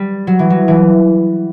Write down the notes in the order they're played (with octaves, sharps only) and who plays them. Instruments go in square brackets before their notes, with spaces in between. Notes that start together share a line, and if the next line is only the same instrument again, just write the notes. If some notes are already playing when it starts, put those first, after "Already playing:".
Already playing: [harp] G3
F#3
E3
F#3
E3